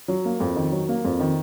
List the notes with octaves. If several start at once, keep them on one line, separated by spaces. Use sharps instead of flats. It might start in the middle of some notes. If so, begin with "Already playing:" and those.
F#3
A#3
F2
D#3
F#3
A#3
F2
D#3